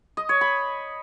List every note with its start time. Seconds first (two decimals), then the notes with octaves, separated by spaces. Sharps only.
0.17 D#5
0.29 C#5
0.41 B5